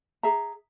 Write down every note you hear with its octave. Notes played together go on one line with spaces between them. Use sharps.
G#4 E5 A#5